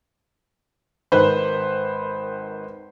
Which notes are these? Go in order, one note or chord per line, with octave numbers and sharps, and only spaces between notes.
G#1 D#3 B4 C5 C6